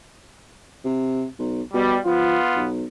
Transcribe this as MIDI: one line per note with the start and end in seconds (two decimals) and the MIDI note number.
0.85 1.25 48
1.39 1.62 35
1.74 1.96 47
1.74 1.99 55
2.05 2.39 53
2.05 2.68 59
2.05 2.68 65
2.56 2.84 35